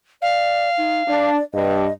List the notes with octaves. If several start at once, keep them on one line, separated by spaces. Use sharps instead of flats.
D5 F5
D#4
D4 D5
G2 D#5